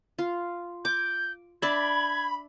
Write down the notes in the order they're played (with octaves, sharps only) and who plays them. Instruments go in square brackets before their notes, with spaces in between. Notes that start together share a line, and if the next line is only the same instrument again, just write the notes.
[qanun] F4
[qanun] D6 [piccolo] G6
[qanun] D4 D5 E5 [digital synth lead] B5 [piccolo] G#6